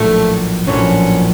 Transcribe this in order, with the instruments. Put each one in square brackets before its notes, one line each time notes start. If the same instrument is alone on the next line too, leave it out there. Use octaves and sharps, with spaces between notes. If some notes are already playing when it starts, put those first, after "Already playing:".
Already playing: [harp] A#1 A2 F#3 [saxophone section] A3
[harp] A#1 A2 F#3 [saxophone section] C#4